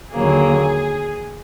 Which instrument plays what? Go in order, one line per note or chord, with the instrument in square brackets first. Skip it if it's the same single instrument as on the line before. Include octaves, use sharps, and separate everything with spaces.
[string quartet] D#2 D3 F#3 A#3 G#4